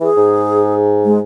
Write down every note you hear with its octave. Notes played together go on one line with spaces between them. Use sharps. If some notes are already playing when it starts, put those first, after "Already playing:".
E3 G#4
G#2
G#3